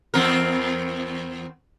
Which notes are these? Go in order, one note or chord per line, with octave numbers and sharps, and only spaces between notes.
E2 C4 A#4